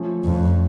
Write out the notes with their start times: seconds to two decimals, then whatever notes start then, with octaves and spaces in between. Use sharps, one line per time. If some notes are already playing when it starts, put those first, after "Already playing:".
Already playing: F3 A3 C#4
0.25 F2